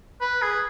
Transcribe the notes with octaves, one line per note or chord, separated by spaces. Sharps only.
B4
G#4